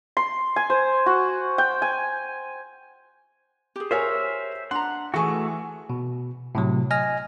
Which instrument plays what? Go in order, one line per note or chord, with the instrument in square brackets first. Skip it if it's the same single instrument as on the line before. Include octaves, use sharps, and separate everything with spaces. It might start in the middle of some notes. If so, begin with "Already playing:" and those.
[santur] C6
G#5
C5
F#4
G5
G#5
[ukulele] G4 G#4
[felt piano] A#4 C#5 G#5 [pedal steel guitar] C5 E5
[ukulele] D4 A#5 [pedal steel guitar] F#5 [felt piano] C6
[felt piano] E3 C#6 [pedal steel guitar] A3 F#4 [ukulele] E4 G#4 G#5
[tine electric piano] B2
A2 C3 F#3
D#5 G#5 F6 A#6